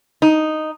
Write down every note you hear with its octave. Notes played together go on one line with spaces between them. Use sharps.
D#4